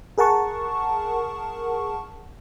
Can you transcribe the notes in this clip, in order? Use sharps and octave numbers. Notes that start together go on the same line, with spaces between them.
G#4 A#4 F#5 A5 C#6